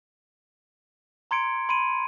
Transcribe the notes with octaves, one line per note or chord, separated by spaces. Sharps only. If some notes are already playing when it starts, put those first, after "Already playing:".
A#5 C6 G#6 C#7 D7
B5 C6 D7 D#7